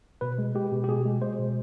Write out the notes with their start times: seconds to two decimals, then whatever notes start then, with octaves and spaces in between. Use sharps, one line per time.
0.21 B2 B4
0.38 G#3
0.55 G#3 G4
0.72 B2
0.84 G4
0.88 B2 G#4
1.05 G#3
1.22 G#3 C5
1.39 B2